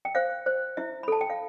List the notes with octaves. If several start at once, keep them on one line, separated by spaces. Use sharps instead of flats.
G5
C5 F5
C5
E4 E5
B5
A4 A5
G5
F5